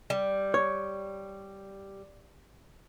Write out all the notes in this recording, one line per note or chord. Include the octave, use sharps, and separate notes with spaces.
G3
C#5